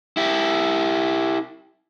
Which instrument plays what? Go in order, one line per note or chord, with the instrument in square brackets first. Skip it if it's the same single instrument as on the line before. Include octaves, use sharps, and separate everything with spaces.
[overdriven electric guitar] E4 G4